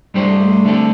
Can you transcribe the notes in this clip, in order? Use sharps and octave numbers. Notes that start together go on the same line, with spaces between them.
G2 G3 A3 D4 G4 C5
D3 G3 C4 A4